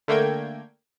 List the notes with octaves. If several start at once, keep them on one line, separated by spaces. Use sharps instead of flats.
D3 A3 A#3 G5 G#6